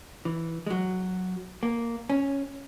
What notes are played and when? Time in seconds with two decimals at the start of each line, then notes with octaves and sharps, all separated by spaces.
0.25 E3
0.66 G#3
0.70 F#3
1.63 A#3
2.10 C#4